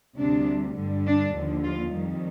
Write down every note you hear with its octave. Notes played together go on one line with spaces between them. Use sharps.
D2 C3 G3 D4
G2 D3 G3
D4
D#2 D3 F3
F4
F2 D#3 G3